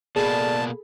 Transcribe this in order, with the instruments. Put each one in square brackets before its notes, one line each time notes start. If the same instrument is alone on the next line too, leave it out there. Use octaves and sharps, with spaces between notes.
[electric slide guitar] B2 A#3 [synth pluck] G#4 A4 B5 [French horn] D5 [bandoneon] A5